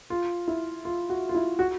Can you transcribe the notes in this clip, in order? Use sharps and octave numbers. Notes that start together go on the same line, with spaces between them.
F4
E4
F4
F#4
F4
E4
F#4